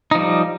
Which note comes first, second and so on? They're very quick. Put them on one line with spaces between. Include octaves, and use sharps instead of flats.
D#4 F3 G3